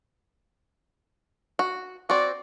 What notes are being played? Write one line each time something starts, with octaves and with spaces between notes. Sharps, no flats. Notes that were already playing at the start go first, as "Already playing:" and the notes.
F#4
C4 F#4 D5